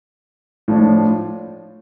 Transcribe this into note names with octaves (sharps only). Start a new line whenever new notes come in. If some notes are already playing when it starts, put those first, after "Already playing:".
A2 F3 D4